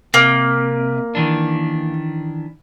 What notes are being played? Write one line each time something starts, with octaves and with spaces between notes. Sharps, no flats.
C3 A#3
D#3 E3 D4